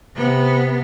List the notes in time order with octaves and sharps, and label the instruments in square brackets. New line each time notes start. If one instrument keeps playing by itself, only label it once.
[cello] C3 B3